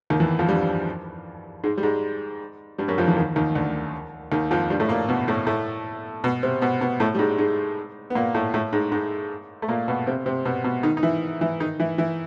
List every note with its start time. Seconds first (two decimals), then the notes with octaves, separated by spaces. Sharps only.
0.10 D#2 D#3
0.20 E2 E3
0.39 F2 F3
0.48 G2 G3
1.64 G#2 G#3
1.78 G3
1.83 G#2 G#3
2.78 G2 G3
2.88 F#2 F#3
2.98 F2 F3
3.07 E2 E3
3.16 D#2 D#3
3.36 D#2 D#3
3.55 D2 D3
4.32 D#2 D#3
4.51 F2 F3
4.70 G2 G3
4.80 A2 A3
4.89 A#2 A#3
5.08 B2 B3
5.28 A2 A3
5.47 A2 A3
6.24 B2 B3
6.43 C3 C4
6.62 B2 B3
6.81 B2 B3
7.00 A2 A3
7.15 G3
7.19 G#2 G#3
7.38 G#2 G#3
8.10 B3
8.15 A#2 A#3
8.35 A2 A3
8.54 A2 A3
8.73 G#2 G#3
8.92 G#2 G#3
9.62 A3
9.68 A#2 A#3
9.88 B2 B3
10.07 C3 C4
10.26 C3 C4
10.45 B2 B3
10.64 B2 B3
10.83 D#3 D#4
10.97 D#4
11.03 E3 E4
11.41 E3 E4
11.60 D#3 D#4
11.80 E3 E4
11.98 E3 E4